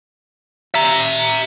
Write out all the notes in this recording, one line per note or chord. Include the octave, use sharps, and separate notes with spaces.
E5 A#5